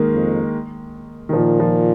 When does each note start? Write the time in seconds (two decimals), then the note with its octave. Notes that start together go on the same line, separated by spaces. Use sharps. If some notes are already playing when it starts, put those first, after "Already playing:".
Already playing: D#3 G#3 A#3
0.13 F2
1.29 D#3
1.33 A#2 F3
1.60 F3